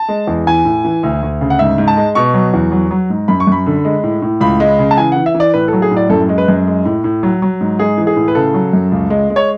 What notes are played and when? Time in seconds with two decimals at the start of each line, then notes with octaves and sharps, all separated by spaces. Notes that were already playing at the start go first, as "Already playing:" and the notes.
Already playing: A5
0.08 G#3
0.27 E2
0.46 E3 G#5
0.65 A2
0.85 E3
1.03 D2
1.22 D2
1.41 C#3
1.50 F#5
1.59 G#2 E5
1.78 G#2
1.88 A5
1.97 G#3
2.15 B2 C#6
2.34 F#3
2.54 E2
2.72 F#3
2.91 F#3
3.10 G#2
3.28 F#2 B5
3.40 C#6
3.47 F#2 B5
3.66 D3
3.85 G#3
4.03 A2
4.22 A2
4.41 C#2 B5
4.60 G#3
4.79 C#3
4.91 A5
4.97 E3 G#5
5.12 E3 F#5
5.26 E5
5.34 E3
5.40 D5
5.54 A2 B4
5.68 F#3 A4
5.82 G#4
5.91 A2
5.97 D5
6.10 F#2 A4
6.29 G#3
6.38 B4
6.48 F#2
6.67 G#3
6.85 A2
7.04 A2
7.23 F#3
7.42 F#3
7.61 G#2
7.79 G#3 G#4
7.98 E3
8.07 G#4
8.16 A2
8.28 B4
8.35 C#3 A4
8.54 F#3
8.73 F#2
8.92 C#2
9.10 G#3
9.30 G#3
9.36 C#5